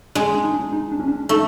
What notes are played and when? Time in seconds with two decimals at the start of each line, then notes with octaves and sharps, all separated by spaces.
0.15 G#3 D4
0.35 D4
0.44 D#4
0.54 D4
0.73 D#4
0.92 D4
1.00 C#4
1.08 D4
1.29 A3 D#4